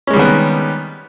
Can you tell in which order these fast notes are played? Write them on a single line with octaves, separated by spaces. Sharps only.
C#4 G#3 G3 D#3 B3